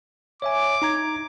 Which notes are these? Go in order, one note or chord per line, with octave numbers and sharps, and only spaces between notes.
C#5 E5 G#5 D6
D#4 A#5 G#6